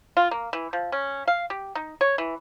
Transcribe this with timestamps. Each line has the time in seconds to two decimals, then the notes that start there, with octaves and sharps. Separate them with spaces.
0.17 F4
0.31 A#3
0.53 E3
0.73 F3
0.92 C#4
1.27 F5
1.50 G4
1.75 D#4
2.01 C#5
2.18 E3